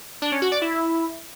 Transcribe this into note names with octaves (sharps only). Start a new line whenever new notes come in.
D4
C#4
F#4
D5
E4